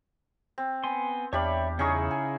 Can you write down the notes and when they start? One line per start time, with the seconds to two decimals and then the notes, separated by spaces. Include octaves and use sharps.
0.58 C4
0.84 B3 G#5 C6
1.33 E2 D4 G4 C#5 E5 F5 B5
1.79 C#3 C#4 D#4 E4 G#4 C#6
2.11 G#5